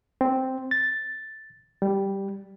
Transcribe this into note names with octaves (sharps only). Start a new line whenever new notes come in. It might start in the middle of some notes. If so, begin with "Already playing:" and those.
C4
A6
G3